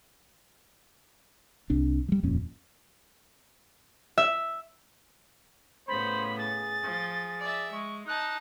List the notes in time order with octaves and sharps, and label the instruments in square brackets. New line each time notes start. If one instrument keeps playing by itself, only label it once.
[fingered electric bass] C2 C3 D4
F#3 G3
D#1 F2 A#2 C#4
[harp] E5
[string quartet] A2 C#3 B3 [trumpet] C5 [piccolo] B5
[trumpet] G#4 [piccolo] A6
[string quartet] F3
D5 E5
[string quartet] G#3 [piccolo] C#6
[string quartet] D#4 A5 [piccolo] F#6